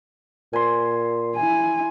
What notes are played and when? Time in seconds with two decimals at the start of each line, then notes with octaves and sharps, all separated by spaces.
0.53 A#2 G#5 C6
1.37 E4 G#5